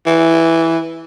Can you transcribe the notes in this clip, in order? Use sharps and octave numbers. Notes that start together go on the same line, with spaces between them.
E3